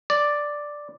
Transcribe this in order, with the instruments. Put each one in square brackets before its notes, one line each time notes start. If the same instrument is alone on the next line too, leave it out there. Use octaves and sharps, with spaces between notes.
[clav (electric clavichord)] D5